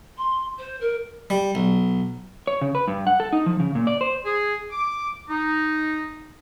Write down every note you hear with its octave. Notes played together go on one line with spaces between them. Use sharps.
C6
C5
A#4
G3
B1
C#5
C#3
B4
G2
F#5
A4
D#4
F3
C#3
A#2
D5
C5
G#4
D6
D#4